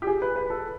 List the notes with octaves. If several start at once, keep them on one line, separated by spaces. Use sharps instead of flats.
G4
G#4
B4
B4
A4